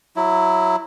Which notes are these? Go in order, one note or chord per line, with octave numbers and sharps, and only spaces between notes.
F#3 E4